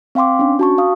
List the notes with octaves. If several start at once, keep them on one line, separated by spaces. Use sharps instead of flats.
C4 F5 G5 C6 D6
C#4 D4
F#4 A5 C#6
F5 D#6